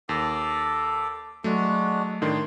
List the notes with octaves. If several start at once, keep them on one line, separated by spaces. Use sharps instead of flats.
D#2 A4 D6
F#3 G#3 A3 D4 F#4
A2 D#3 D4 C6